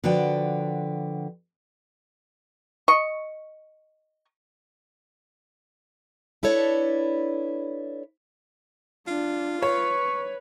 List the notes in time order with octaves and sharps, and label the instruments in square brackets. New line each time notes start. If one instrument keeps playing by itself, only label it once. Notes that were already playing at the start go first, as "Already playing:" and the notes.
[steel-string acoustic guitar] D3 F3 F#4 B4 D5 G5
[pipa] D#5 C#6
[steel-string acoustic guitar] D4 E4 A4 B4 C#5 D5
[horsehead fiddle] D4 [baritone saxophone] F4
[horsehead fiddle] B4 [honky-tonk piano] C#5 [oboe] C#6